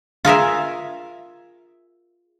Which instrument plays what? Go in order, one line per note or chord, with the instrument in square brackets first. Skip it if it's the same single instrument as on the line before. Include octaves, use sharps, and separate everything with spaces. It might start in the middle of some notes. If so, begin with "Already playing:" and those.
[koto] F4 G#4 A#4 E5